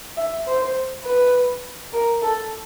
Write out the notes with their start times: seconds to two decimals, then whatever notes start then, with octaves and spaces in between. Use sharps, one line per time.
0.17 E5
0.47 C5
1.05 B4
1.93 A#4
2.22 A4